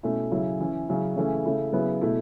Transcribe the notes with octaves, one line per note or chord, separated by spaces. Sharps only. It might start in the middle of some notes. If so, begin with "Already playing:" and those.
B2 A3 C#4 E4
C#3 F#3 C#4 E4
E3 C#4 E4
C#3 F#3 C#4 E4
C#3 E3 A3 C#4 E4
C#3 A3 E4
C#3 F#3 B3 E4
B2 A3 E4